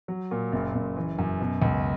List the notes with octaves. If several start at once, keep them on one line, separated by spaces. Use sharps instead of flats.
F#3
A#2
F#1
F#1
E3
F#2
B2
C#2